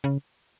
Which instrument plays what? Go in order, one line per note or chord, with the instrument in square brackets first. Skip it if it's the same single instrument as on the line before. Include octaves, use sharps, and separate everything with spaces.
[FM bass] C#3